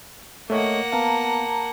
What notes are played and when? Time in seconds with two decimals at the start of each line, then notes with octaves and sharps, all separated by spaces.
0.50 A3 A#3 C#5 D#5 F#5
0.92 B3 F5 A5 A#5